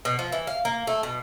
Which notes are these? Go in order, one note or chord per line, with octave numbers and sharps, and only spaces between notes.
B2
F3
E3
F5
A#3
A3
B2